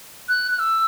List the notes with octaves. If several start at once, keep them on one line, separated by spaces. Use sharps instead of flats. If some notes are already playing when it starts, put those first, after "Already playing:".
F#6
F#6
E6